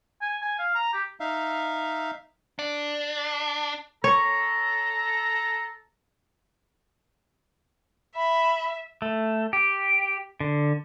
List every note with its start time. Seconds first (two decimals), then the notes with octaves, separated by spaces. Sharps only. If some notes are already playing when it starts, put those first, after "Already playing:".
0.21 G#5
0.42 G#5
0.59 F5
0.75 A#5
0.93 G4
1.20 D#4 E5 F5
2.59 D4
4.04 A4 C#5 A#5
8.16 E5 B5
9.02 A3
9.53 G4
10.40 D3